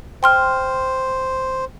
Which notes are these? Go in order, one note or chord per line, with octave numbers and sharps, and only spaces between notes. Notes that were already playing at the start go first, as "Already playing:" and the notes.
C5 G5 C6 F6